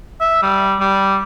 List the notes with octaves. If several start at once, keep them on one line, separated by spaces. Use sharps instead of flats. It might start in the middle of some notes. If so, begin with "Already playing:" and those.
E5
G3
G3